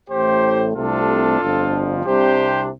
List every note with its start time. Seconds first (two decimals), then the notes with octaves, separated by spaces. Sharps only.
0.09 A1 A2 A3 G4 C5
0.74 C2 C3 A3 D4 F4 A4
1.40 G1 F2 D3 F3
2.05 C2 C3 G3 D4 G4 C5